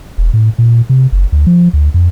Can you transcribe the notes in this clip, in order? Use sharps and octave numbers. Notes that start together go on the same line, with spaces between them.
E1
A2
A#2
C3
F#1
D2
F3
D2
F2